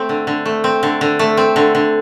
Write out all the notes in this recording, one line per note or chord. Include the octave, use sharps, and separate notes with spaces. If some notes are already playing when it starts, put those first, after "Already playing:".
Already playing: A3 C4
D3
D3
A3
C4
D3
D3
A3
C4
D3
D3